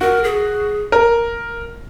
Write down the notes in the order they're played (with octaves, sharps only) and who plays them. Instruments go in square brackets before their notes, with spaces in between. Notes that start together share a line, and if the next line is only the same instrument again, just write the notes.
[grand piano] F#4 [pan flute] A#4
[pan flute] G#4
[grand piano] A#4